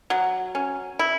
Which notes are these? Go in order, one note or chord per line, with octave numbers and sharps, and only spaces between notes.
F#3
C#4
E4